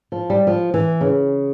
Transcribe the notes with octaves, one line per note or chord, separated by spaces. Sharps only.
F3
G3
F3
E3
C#3